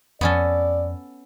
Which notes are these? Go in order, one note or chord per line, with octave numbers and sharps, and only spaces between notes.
F2 B3 C#4 A4 D5